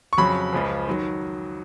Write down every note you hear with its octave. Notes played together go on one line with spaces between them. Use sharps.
C#6
F2 C#3 F#3 B5
C#2 C#3 F3
D#3 F#3